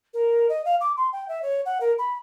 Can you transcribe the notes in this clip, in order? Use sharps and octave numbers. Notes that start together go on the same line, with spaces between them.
A#4
D#5
F5
D6
C6
G5
E5
C#5
F#5
A#4
B5